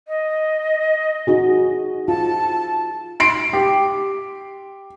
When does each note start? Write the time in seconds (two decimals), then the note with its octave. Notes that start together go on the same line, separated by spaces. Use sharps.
0.08 D#5
1.27 D#4 F#4 G#4
2.08 F4 A5
3.20 C6 C7 D7
3.53 G4